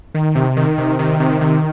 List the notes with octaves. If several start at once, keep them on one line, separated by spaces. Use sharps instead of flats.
D#3
C3
D#3
C3
D#3
C3
D#3